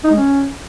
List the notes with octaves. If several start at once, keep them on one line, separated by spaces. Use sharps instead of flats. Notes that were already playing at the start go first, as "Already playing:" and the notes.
D#4
G#3
C#4